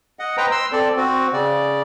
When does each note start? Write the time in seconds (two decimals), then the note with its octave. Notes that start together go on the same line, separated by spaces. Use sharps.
0.19 D#5 F#5
0.37 B4 C5 D#5 G5 A#5
0.51 C6 E6
0.72 C4 A4 D5
0.97 C4 F#4
1.33 C#3 D5